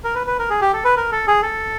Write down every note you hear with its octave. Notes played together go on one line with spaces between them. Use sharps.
A#4
B4
B4
A#4
G#4
G4
A4
B4
A#4
A4
G#4
A4